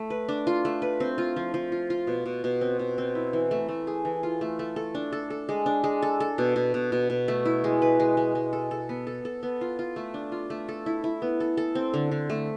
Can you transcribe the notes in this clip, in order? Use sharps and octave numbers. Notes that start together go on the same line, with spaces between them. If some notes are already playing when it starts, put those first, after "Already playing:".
Already playing: A3
B4
D4
F4
A3
B4
C4
F4
F3
F3
F4
F4
B2
B2
B2
C4
B2
C4
E4
E3
A3
A3
G#4
E3
F4
A3
A3
A4
D4
A4
A4
G#3
D4
G#3
A4
A4
B2
B2
B2
B2
B2
A3
E4
G#3
B4
G#3
G#3
G#3
A4
A4
B3
A4
A4
B3
F4
F4
A3
D4
F4
A3
A4
E4
E4
B3
A4
A4
C4
D3
D3
A3